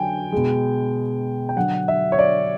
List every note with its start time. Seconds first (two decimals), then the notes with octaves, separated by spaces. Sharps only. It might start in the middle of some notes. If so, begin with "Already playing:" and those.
Already playing: D3 F#3 G5 G#5
0.32 B2 G#3
1.49 G5
1.56 D3 F#3 F#5
1.88 E5
2.12 C#5
2.19 D5